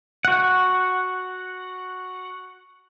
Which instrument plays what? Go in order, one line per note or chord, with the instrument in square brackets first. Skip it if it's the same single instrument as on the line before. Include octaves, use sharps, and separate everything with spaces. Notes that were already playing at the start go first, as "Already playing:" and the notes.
[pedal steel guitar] F#4 F#5